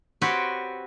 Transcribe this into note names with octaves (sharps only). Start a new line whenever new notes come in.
C4 F#4 G4 B4 C#5